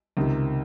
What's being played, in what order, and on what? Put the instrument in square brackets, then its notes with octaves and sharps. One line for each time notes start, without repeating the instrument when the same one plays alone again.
[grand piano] C#2 C3 D#3